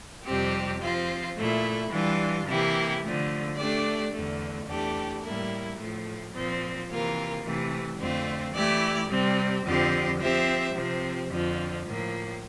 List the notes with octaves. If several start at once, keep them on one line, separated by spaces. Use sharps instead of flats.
F2 C3 G3 C4 G4
F3 C4 F4
A#2 A3 E4
E3 G3 D4 F4
C3 E3 A#3 E4 G4
D3 F3 A3
A3 D4 G4 D5
E2 D3 A3
E2 E3 A3 D4 G4
A2 G3 A#3 E4 A#4
A2 F3 A3
A#2 F3 C4
C3 E3 A#3 F4 A#4
C3 E3 A3
F2 D3 A3 C4 F4
E3 A3 E4 G4 D5
C3 G3 C4
F2 D3 F3 C4 G4
F3 C4 G4 C5 E5
C3 F3 C4
F2 D3 F3
A2 F3 A#3